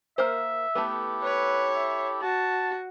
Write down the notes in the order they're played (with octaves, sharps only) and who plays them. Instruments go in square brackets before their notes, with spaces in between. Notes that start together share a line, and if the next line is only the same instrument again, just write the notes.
[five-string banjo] A#3 A#4 C5 [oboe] E5
[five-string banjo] A3 B3 [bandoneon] E4 G4 A4
[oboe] B4 [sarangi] C#5
[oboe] E5
[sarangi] F#4 [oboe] A5